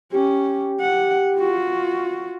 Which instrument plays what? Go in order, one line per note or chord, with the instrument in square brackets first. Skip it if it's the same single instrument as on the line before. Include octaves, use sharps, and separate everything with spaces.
[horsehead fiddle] C#4 [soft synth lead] G4
[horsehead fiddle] F#5
F4 F#4